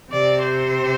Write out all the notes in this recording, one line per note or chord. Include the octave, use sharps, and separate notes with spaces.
C3 D5
C5